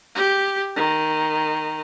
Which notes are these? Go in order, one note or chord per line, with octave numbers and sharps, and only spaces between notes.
G4
D#3